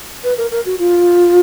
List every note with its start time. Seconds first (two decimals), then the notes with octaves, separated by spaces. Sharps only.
0.24 B4
0.38 A#4
0.51 A#4
0.66 F#4
0.79 F4